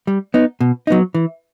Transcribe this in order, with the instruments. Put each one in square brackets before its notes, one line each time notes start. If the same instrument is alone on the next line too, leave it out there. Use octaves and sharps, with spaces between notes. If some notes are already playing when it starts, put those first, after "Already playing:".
[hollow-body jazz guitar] G3
B3 D#4
B2
F#3 B3 D#4
E3